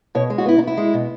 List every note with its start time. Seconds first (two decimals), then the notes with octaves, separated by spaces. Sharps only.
0.15 B2 C#5
0.30 G#3
0.38 F#4
0.46 B3 E4
0.58 D#4
0.62 B3 E4
0.77 G#3
0.94 B2